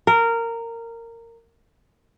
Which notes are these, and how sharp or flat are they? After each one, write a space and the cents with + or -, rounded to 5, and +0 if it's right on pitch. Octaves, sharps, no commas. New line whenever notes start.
A#4 -15